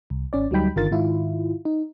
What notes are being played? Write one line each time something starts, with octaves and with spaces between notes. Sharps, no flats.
C2
G#1 C#4 D5
D2 F#3 G3 D#4 G5 B5
G1 D3 D#3 F4 A#4 A6
G#2 D#3 E4 F4
D#4